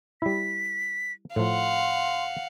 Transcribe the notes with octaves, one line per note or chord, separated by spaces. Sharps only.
G3 E4 B6
A2 F3 F5 F#5 C6